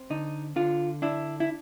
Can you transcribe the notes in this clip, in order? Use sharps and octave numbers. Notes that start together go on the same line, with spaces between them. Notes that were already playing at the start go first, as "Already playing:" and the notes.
Already playing: C4
D3 D#4
D3 F4
D4 E4
E4